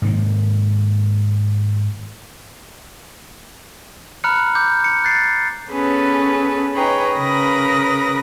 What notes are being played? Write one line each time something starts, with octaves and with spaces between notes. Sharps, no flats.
G#2 D#3 A#3
A#5 B5 F6 F#6 C#7
D6 G6
C#7
F#6 A6 C7
B3 C#4 G#4 A4 B4
D#4 G#4 B4 C#5 G5 A#5
C#3 A#4 B4 B5 D#6 A#6